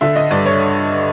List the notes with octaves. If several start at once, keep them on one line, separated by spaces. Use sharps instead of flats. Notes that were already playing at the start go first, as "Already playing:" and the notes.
D3 E5
D#5
G2 D5
C#5